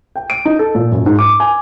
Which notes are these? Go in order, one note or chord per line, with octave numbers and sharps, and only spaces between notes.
G5
D7
D#4
A4
A#2
F#2
G#2
D6
G#5